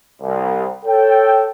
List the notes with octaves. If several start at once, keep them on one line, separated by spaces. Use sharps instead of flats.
C2
A4 C#5 G5